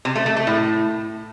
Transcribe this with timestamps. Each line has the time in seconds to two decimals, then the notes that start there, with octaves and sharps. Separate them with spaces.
0.05 C3
0.16 A3
0.26 A3
0.37 A3
0.47 A2